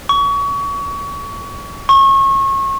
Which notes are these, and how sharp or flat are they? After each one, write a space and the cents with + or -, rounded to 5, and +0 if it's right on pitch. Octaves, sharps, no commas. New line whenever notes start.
C#6 +30
C#6 -30